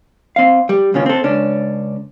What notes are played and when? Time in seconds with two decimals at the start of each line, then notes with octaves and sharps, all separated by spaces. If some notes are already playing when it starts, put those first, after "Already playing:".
0.36 C4 F5
0.69 G3
0.94 D#2 C#3 C#4 F4
1.06 C4 A4
1.24 C#2 C#4 D4